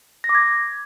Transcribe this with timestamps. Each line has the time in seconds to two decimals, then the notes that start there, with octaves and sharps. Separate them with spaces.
0.24 A#6
0.29 D6
0.35 G#6